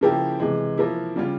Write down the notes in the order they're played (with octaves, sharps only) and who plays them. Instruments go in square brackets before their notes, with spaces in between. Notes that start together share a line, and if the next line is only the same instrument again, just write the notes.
[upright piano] C#3 F3 A#3 E4 G4
C3 E3 G#3
F3 A#3 E4
C#3 G3 C#4 F4